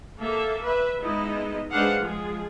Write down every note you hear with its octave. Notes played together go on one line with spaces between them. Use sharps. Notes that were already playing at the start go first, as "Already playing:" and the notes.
A#3 A4 E5
B4 E5
G#3 B3 D#4 E4 D#5
G#3 D4 B4 C5 F5 F#5
F3 G#3 F4 G#4